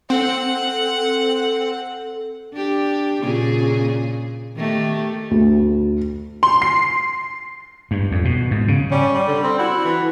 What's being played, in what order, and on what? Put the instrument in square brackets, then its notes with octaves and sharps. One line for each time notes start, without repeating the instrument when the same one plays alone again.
[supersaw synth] C4 [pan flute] A4 [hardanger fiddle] F#5
[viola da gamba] D4 G4
A#2 C#3 G#4
D#3 A3 G4
[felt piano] D2
[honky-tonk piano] C6
C7
[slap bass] G2
F2
B2
G#2
C#3
[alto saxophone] G3 [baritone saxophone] C#4
[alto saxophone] G3
[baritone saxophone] D3
C4
[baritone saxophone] E4 [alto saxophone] F#4
[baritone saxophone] E3